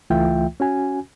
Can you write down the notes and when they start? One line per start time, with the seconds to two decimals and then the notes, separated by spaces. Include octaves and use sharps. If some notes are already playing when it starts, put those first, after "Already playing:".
0.10 C#2 E3 A3 F4 E5 G5
0.60 C#4 F#4 G#5